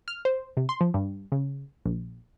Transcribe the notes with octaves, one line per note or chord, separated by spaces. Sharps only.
F6
C5
C3
C6
F3
G2
C#3
A#1